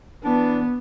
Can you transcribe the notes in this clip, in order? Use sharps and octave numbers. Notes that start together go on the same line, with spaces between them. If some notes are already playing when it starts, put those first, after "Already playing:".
E3 B3 D4